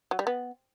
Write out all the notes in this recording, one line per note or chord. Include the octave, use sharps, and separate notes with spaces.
F#3
G3
B3